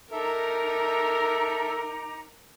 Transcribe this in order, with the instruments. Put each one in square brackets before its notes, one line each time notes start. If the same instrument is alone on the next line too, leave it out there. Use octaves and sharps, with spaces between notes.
[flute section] D#4 A#5 D6 [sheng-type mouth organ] A4 E5 [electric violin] A#4